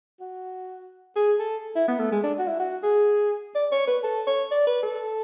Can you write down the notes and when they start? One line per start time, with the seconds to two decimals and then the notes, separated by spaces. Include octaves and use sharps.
0.20 F#4
1.16 G#4
1.39 A4
1.76 E4
1.88 B3
2.00 A3
2.12 G#3
2.24 D4
2.39 F#4
2.47 E4
2.60 F#4
2.83 G#4
3.55 D5
3.72 C#5
3.87 B4
4.03 A4
4.27 C#5
4.51 D5
4.67 B4
4.83 A4